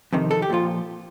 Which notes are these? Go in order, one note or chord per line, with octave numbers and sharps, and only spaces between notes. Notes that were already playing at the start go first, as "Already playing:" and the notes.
F2 C3 D#3
A4
G4
A#2 F3 F4